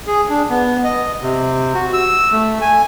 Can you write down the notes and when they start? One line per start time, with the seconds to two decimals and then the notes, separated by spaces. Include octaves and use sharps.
0.07 G#4
0.29 D4
0.50 B3
0.84 D#5
1.21 C3
1.74 F#4
1.93 E6
2.32 A3
2.61 G#5